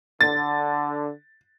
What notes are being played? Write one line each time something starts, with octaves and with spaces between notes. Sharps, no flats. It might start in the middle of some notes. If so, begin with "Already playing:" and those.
D3 A6